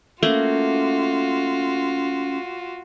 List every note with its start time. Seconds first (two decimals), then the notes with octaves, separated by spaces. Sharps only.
0.23 A3 A#3 C#4 F4 F#4